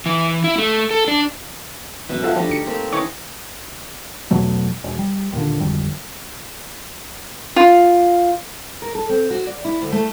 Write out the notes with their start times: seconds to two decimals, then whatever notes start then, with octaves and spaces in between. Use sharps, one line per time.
0.06 E3
0.44 E4
0.58 A3
0.91 A4
1.08 D4
2.09 A1 F#2 B2 E5
2.24 F3 F4 A4 E5 F#5 A5
2.36 F3 G3 A3 D4 D#4
2.49 D2 C#7
2.66 A3 A#3 C4 G4
2.93 E3 C#4 D#4 C#5
4.31 E2 B2 F#3 A3
4.84 E1
4.99 G3
5.33 D#2 A#2 D3
5.60 G#1 F2 D3 G3
7.56 F4
8.82 A#4
8.95 A4
9.09 C4
9.31 F#4
9.47 D5
9.65 E4
9.81 D2
9.92 A3